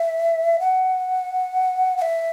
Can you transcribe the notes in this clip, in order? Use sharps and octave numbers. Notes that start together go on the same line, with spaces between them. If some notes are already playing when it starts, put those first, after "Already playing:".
Already playing: E5
F#5
F#5
E5